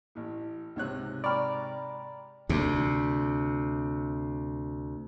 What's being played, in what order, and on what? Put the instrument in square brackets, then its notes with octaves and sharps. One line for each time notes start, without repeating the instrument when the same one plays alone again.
[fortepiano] A1 A2
[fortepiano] C#2 C#5 F#6 [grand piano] G#2 C3
[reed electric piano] D5 [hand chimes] G5 A#5 B5 [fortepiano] C#6 D6 F6
[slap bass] D2 C3